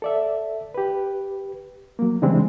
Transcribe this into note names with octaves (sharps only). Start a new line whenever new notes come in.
A4 D5 E5
G4 B4
F#3 A#3
C#3 E3 G3 G#3 C4 D4